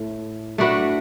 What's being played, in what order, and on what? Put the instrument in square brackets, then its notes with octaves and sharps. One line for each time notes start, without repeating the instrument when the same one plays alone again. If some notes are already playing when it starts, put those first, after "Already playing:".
Already playing: [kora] A2 A3
A3 D4 F#4 B4